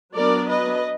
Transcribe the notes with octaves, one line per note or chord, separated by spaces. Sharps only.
F#3 B3 D4 A#4 D5
B4 D#5